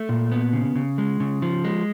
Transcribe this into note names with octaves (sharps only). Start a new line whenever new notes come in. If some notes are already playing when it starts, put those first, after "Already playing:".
Already playing: A3
A#2
B3
C#3
C#3
G#3
C#3
F3
G#3